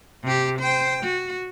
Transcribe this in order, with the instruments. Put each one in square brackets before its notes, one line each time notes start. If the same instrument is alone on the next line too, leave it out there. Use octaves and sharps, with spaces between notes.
[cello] C3 G4
C5 G5
F#4